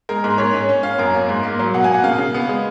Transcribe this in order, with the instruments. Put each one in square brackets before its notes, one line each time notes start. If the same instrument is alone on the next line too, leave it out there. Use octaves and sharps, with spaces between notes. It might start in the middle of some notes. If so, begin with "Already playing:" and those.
[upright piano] G#3 A#4
G#2 A#4
G#2 C#5
C#4
C#4
C#4 F5
F#2 A#4
A#3
G#2
A#3
F#3
B2 F#5
A#3 G#5
F#5
C#3 F5
C#3
B3
G#3